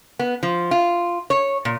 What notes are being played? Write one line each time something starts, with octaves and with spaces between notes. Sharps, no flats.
B3
F3
F4
C#5
A#2